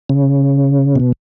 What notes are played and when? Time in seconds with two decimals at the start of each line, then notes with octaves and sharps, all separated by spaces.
0.09 C#3
0.96 B2